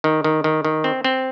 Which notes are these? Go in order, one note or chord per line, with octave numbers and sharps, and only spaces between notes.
D#3
D#3
D#3
D#3
C4
C4